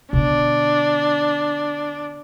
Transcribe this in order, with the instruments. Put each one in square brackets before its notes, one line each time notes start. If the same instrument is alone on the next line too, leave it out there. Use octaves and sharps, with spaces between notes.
[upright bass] B2 D3 [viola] D4